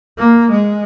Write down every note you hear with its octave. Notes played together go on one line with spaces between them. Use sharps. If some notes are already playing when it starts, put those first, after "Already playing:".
A#3
G#3